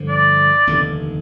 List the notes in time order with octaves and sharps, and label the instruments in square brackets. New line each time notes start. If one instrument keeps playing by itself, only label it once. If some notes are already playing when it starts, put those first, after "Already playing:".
Already playing: [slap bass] G2 D3 F3
[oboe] D5
[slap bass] F1 D#2 D3